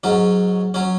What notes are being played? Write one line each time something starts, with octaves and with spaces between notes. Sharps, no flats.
G#2 F#3 C#4
F#3 C#4